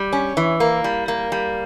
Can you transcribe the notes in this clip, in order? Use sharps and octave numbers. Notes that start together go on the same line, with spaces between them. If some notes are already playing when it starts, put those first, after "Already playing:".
Already playing: G3
C#4
E3
A#3
G3
A#3
G3